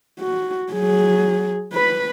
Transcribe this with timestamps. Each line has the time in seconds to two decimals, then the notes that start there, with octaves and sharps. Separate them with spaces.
0.20 F#4
0.73 F#3 G#4
1.73 B4 B5